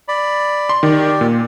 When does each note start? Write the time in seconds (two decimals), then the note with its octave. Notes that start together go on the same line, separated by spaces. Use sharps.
0.08 D5 B5
0.69 C6
0.83 D#3 G4 D5
1.21 A#2